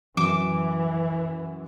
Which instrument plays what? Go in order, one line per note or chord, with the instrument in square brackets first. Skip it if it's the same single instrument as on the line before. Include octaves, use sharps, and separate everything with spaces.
[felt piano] F#2 [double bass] E3 [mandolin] D6